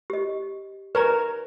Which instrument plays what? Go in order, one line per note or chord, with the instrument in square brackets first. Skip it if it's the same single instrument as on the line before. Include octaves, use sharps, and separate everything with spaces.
[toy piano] G4 D#5
[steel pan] A#4 C#5 [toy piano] B4 A#5